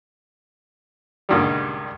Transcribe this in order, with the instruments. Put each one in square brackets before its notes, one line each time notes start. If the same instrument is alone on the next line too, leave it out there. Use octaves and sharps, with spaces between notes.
[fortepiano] C#2 G2 A#2 D3 D#3 G3